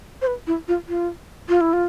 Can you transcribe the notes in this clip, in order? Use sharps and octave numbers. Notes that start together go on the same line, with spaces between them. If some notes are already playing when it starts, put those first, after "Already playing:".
C5
B4
E4
F4
F4
F4
E4
F4